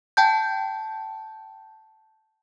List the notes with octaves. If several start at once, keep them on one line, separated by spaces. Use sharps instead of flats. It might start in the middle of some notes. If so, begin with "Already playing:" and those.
G5 A5 G6